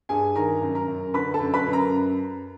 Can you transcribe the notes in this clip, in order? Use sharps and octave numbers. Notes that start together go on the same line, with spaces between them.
G2 G#4 G#5
D#3 A#4 A#5
F#2
A#4 A#5
F#2
D3 B4 B5
A4 A5
F#2
B4 B5
F#2
A#4 A#5